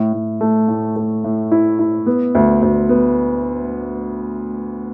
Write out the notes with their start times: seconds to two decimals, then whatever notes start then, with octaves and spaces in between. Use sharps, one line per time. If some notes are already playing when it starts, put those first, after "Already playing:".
Already playing: A2
0.13 A2
0.41 A3
0.68 A2
0.96 A3
1.24 A2
1.52 E4
1.79 E4
2.06 B3
2.35 D2
2.62 D2
2.89 B3